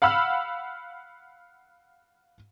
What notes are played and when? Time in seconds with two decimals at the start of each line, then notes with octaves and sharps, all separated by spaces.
0.02 F5 F#5 B5 E6 F6